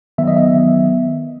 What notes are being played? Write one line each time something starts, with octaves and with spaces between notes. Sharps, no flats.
D#3 F#3 B3 E5
D#5
E5
D#3 F#3 B3